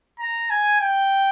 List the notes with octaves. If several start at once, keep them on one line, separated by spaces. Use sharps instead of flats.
A#5
G#5
G5